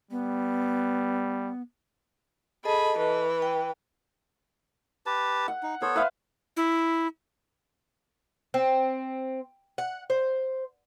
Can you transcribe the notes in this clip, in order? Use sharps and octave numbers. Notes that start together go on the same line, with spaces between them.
G3 B3
G#4 A4 D#5 A5 B5
E3 B4
G5
G4 B4 A5
F#5
D#4
B3 A4 C5 C#5
B4 E5 F5
E4
C4
F#5
C5